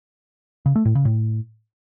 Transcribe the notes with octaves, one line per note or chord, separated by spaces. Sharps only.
C#3
A3
A2
C#3
A2